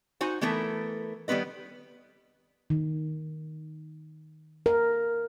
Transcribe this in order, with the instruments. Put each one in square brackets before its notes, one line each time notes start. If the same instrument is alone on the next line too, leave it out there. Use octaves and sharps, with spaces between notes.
[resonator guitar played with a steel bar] D#4 F#4 C5 G#5
E3 A3 B3 A4 A#4
D#3 G3 B3 B4 D#5
[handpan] D#3
A#4